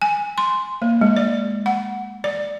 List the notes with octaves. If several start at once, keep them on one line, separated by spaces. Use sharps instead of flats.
G#5
C6
A#3
G#3
D5
F#5
D5